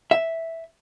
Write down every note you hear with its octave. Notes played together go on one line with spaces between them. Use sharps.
E5